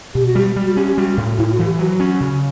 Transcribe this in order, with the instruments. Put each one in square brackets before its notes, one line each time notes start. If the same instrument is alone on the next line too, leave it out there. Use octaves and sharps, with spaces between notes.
[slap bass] B2 [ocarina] G4
[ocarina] F#4
[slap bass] G3 [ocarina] G4
[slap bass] G3
[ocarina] F#4
[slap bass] C#4 [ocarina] G4
[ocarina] G4
[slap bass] G3 [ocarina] F#4
[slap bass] A2
[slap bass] A2 [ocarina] E4
[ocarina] E4
F#4
[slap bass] E3
[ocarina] G4
[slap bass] F#3 [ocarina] F#4
[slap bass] C#4
C#3